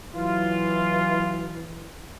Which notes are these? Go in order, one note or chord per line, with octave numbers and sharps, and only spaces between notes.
E3 F#3 E4 F4